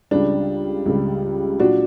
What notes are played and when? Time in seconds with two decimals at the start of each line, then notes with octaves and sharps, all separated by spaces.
0.11 C#2 C#3 G3 D4
0.86 C#2 C#3 G3
1.59 A#2 F#3 D4 F#4